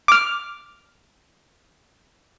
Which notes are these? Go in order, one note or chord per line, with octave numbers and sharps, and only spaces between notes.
D6 F6